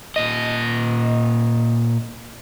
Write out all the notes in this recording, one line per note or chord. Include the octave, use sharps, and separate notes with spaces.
A#2 D#5